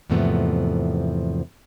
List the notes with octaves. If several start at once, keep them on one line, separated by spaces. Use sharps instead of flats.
E2 G#2 C3 F3 A3 B3